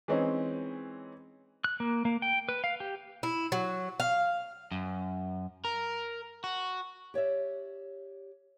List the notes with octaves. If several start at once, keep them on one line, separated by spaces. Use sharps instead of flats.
E3 G#3 C4 C#4 D#4
F#6
A#3
A#3
G5
B4
F5
G4
E4
F#3
F5
F#2
A#4
F#4
G4 C#5 D5 E5